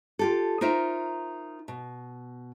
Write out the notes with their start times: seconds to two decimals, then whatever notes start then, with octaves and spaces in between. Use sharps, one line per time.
0.19 F4 G4 A4
0.61 D#4 F4 A#4 C5 E5
1.68 B2